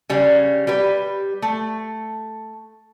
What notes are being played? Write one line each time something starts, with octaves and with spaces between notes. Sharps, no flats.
C#3 G3 C#4
G3 G4 B4
A3